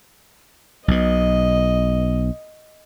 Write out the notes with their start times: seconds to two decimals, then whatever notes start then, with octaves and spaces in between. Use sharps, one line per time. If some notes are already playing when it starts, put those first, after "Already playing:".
0.88 B1 B2 D#5